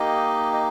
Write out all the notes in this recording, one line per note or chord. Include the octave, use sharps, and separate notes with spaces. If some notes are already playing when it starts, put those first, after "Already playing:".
Already playing: A#3 D#4 G4 D#5
D#5